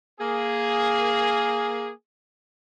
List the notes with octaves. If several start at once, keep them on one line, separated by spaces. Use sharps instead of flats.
A#3 G#4